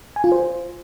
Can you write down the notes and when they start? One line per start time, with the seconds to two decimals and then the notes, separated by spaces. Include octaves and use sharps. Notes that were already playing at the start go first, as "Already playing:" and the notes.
0.16 G#5
0.24 F4
0.32 C5